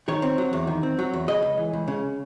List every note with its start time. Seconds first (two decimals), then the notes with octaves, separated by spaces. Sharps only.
0.08 D#3 C#5
0.22 C4
0.38 F#3
0.53 E2
0.67 D#3
0.83 C4
0.99 F#3
1.14 E2
1.28 C#3 D#5
1.43 C#2
1.58 E3
1.73 C#2
1.88 C#3